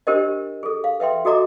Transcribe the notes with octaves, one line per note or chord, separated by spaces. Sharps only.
D4 G4 A#4 C5 D#5
G#4 A4
F5
B4 E5 G5 C6
F#4 A4 D#5 A#5 D6